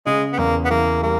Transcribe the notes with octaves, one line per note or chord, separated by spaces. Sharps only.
C#3 G#3
B3
E2 A#3
B3
E3 A#3
G3 A#3